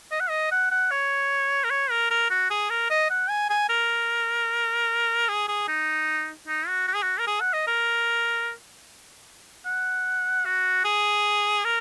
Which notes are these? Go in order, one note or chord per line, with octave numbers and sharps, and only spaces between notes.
D#5
F#5
D#5
F#5
F#5
C#5
A#4
C#5
A#4
A#4
F#4
G#4
A#4
D#5
F#5
G#5
G#5
A#4
G#4
G#4
D#4
D#4
F#4
F#4
G#4
F#4
A#4
G#4
F#5
D#5
A#4
F#5
F#4
G#4
A#4